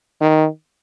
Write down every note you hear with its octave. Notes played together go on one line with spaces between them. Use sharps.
D#3